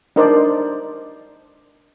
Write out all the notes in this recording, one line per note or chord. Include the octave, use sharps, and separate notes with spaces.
D4 D#4 A#4 C5 D5